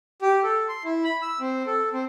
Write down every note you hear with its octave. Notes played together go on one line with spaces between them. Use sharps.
G4
A4
C6
E4
B5
E6
C4
A4
C4